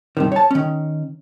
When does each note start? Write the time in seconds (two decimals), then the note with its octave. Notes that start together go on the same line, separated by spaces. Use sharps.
0.17 G2 C3 D#3
0.32 C#5 A5
0.51 D#3 C#4